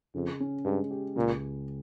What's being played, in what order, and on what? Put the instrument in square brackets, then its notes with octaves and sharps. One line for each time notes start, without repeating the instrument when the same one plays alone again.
[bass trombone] F2 [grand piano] C#3
[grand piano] C#4
[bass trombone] G2 [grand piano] G#3
[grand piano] G4
[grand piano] C#2 [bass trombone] A#2